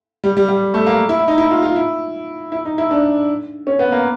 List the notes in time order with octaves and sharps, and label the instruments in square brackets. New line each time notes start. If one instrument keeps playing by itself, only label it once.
[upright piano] G3
G3
G3
A3
A#3
E4
E4
D#4
E4
F4
F4
E4
E4
D#4
E4
D4
C#4
B3
A#3